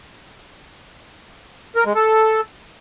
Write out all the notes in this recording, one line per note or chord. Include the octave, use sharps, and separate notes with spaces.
A#4
G#3
A4